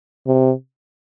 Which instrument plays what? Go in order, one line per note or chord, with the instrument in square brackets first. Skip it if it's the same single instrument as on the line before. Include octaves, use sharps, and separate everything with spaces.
[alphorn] C3